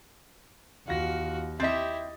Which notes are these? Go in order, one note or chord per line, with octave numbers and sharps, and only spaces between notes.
D#2 F4 F#4 A#6
C4 E4 G4 D#5 E5 A6